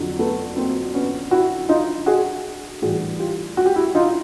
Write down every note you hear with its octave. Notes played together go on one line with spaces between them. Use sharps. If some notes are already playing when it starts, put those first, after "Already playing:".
Already playing: F2 D3 F#3
A3 B3
A#3 C4
B3 C#4
E4 F#4
D#4 F4
F#4 G#4
A2 E3 G3 F#4 G#4
F4 G4
F#4
G4
E4 F#4
D#4 F4